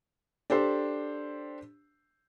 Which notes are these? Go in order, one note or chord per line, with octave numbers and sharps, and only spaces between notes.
D4 G4 A4 C5